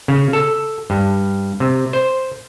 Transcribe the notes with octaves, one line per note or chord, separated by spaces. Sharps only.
C#3
A4
G2
C3
C5